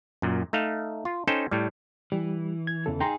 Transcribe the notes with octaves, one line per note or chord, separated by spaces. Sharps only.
F#2 A#2
A3 D#4 F5
F4
C#4 D#4 A4 C5 G5
A2 G3
E3 G3
G#6
E2 C#3 A4
D#4 G#4 G5 A#5 C6